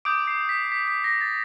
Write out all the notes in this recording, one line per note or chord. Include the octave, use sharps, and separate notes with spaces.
D6 D#6 G6 D7
C7
B6
B6
B6
A#6
A6